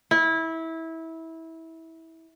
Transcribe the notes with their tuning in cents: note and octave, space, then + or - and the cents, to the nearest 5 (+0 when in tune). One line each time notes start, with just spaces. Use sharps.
E4 -20